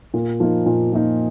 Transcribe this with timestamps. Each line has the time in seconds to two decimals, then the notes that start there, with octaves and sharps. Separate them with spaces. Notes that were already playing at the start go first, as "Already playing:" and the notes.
0.14 A#2
0.40 F3 A#3 D#4
0.66 A#2
0.92 F3 A#3 D#4